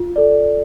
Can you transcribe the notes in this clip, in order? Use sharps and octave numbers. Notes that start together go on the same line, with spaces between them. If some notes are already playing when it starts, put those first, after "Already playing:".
Already playing: F4
A4 D5